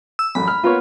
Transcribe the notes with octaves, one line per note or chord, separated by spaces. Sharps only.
E6
A1 F#2 B5
F6
A#3 B3 F4 C#5